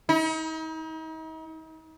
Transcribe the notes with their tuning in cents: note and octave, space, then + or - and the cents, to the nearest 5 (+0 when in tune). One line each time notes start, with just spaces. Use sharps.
D#4 +40